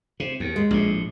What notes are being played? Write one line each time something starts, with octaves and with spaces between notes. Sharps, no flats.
C3
D#2
G#3
A#1 A2